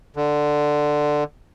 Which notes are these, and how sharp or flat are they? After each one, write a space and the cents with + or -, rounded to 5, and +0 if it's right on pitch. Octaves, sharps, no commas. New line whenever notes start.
D3 +10